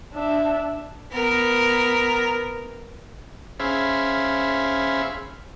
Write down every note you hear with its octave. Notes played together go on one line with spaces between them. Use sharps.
D4 E5
B3 A#4
C#4 G#4 C5 E5 F5 B5